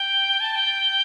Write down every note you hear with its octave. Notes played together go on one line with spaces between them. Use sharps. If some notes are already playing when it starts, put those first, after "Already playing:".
Already playing: G5
A5
G5